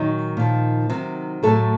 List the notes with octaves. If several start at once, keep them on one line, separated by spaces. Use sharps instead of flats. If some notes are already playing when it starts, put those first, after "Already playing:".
Already playing: A#2 D#3 F#3 D#4
A#2 F3
C3 D#3 F#3
A2 F#3 A3 A4